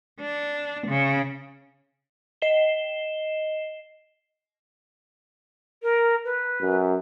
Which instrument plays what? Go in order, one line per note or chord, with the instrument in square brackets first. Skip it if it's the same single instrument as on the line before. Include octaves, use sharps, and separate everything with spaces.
[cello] D4
C#3
[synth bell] D#5 C7 E7 G7
[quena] A#4
B4
[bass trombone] F#2